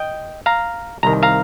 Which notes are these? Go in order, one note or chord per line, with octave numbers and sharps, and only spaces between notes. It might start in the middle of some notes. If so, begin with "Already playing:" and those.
Already playing: D#5 G5
F5 A#5
C2 C3 D#3 A#5
F5 A#5